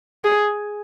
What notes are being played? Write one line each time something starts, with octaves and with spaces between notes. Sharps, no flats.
G#4